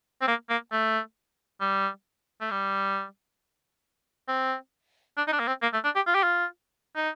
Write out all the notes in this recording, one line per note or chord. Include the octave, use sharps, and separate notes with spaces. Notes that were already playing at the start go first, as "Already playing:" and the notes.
C4
A#3
A#3
A3
G3
A3
G3
C4
D4
D#4
D4
A#3
C4
A#3
A3
D4
G4
F4
G4
F4
D#4